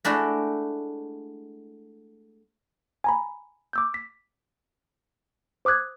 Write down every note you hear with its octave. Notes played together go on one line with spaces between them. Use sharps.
G#3 A3 D4 E4 F#4
G#5 A#5 B5
D6 E6 G6
B6
C5 D6 D#6 F#6 G#6